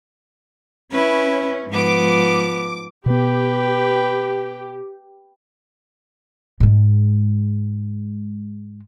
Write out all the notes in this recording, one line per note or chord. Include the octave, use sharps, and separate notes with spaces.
C#4 E4 B4
G#2 F3 B3 D6
B2 B3 G4 B4 G5
G#2 G#3